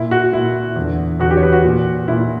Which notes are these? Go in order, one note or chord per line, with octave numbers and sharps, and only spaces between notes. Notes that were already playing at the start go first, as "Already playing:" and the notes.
Already playing: A#2 E4
F#4
A#2 E4
E2
D3
E2 D3 F#4
G4
C#5
B4
F#4
A#2
A#2 E4